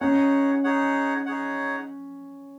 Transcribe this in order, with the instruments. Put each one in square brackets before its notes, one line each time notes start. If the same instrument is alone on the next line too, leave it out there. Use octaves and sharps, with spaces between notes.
[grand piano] C#4 [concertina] D#4 G#4 C#5 F#5
[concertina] D#4 G#4 C#5 F#5
D#4 G#4 C#5 F#5